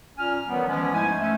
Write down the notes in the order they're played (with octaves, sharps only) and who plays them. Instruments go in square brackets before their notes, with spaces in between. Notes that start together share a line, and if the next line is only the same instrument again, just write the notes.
[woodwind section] A#2 C#4 G#5 F6
D#3 E3 F#3 G3 B3
E3 F3 G#3 B3 C#4
G#2 G#3 A3 E4 C5 G#5
A3 C#4